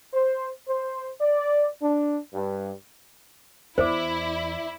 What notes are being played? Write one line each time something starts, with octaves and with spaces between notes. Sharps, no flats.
C5
C5
D5
D4
G2
E2 E4 C5 D5 E5 D6